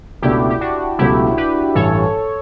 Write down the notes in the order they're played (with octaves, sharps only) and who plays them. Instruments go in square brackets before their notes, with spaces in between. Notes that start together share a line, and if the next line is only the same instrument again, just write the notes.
[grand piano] C#2 B2 A3 D4 [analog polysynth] E4 G4
[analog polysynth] G4
D4 F#4
[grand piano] C#2 B2 F#3 A3 [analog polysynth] E4 G4
[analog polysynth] G4 B4
[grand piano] A1 G2 E3 [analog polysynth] A4 C#5